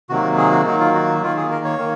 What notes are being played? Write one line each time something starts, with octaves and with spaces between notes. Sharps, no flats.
C3 D#3 F#3 A#3 F#4
G#4
F#4
D#3 F#3 A#3 D#4
F4
F#4
D#3 A#3 F4
G#4
A#4
C#5
D#3 A#3